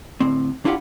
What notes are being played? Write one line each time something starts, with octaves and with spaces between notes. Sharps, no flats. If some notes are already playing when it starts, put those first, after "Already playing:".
D2 A2 C4
D4 E4 F4 G4 F#5